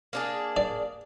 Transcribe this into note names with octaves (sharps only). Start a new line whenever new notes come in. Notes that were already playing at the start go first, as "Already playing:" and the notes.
A#3 D4 G#4
D5